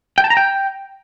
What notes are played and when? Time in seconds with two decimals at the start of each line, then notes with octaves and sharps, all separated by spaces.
0.18 G5
0.24 A5
0.30 A#5
0.37 G5